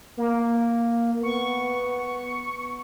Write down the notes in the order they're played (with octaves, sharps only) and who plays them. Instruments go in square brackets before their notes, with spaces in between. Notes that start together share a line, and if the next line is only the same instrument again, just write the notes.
[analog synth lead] A#3
[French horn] B3 [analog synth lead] C#6